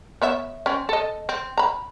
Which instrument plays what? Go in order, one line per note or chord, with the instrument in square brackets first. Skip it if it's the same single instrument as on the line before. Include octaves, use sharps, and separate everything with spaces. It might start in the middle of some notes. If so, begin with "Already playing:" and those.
[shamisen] B3 C#5 E5
C4 C#4
A4 D#5
C4
A#5 B5